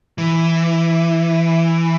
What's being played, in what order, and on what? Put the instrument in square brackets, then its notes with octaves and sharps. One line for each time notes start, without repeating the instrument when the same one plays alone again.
[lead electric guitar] E3